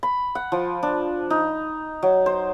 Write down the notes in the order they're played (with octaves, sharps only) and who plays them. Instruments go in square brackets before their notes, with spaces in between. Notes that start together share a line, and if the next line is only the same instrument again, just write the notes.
[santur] B5
F#5
F3
D4
D#4
F#3
C5